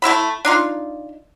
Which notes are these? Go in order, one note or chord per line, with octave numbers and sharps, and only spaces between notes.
A3 E4 E5 B5
D4 D#4 F4